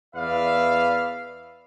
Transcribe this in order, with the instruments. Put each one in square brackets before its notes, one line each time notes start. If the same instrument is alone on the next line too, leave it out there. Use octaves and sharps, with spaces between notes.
[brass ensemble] E2 B4 D5 E5 F5